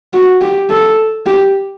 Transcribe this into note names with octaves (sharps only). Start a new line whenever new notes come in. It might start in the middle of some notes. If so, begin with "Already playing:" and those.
F#4
G4
A4
G4